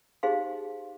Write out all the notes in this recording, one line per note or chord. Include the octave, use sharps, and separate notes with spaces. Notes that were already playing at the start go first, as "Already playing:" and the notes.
D#4 G4 G#4 C5 F5 C6